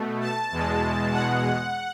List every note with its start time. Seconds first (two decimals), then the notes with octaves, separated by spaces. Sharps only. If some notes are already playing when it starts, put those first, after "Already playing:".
Already playing: B2 A3
0.21 A5
0.52 E2 B2 G#3
1.13 F#5